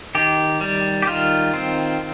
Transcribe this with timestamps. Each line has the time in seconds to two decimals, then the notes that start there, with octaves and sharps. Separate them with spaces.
0.15 D#3 G4
0.61 G3
1.02 G4
1.07 D#3 F4
1.54 C4